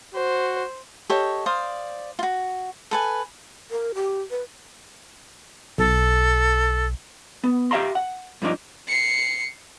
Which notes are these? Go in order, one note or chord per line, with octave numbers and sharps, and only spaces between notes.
F#4 C5
G4 A4 C#5 D#5
C5 D5 F5 D#6
F4 F#4
A4 B4 G#5
A#4
G4
B4
B1 A4
B3
G4 E5 F5 A#5 C6
F#5
G2 F3 G3 D4 D#4
C7 C#7